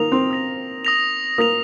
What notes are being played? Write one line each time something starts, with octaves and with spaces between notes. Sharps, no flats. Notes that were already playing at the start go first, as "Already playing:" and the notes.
Already playing: D#3 A#3 D#6 A#6 F7
C4
D#6 A#6 F7
D#6 A#6 F7
A#3 D#6 A#6 F7